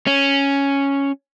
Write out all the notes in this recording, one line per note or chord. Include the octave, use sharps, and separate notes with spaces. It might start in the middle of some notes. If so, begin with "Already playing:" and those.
C#4